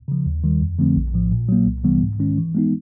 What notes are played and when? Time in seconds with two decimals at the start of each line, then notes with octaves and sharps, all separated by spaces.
0.08 C#3 F3
0.26 D#2
0.44 D#3 G3
0.61 F2
0.79 D3 F3 A3 C4
0.96 A#1
1.14 A2 F3
1.32 A#2
1.49 F#3 A#3
1.66 C2
1.84 C3 E3 G3 B3
2.01 G#2
2.19 D#3 G#3 C#4
2.37 E3
2.55 G#3 B3 D#4